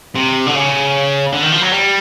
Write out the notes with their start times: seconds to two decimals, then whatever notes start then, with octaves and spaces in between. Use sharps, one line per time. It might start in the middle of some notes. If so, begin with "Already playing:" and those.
0.15 C3
0.46 D3
0.54 C#3
1.33 D3
1.43 D#3
1.52 F3
1.61 F#3
1.71 G3